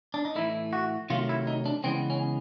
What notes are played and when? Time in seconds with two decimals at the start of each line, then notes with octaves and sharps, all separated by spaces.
0.14 D4
0.25 D#4
0.35 A2 E3 A3 E4
0.73 F#4
1.10 C3 D#3 F#3 A3 F4
1.29 E4
1.47 D#4
1.66 D4
1.84 C#3 E3 G#3 B3 C4
2.10 C#4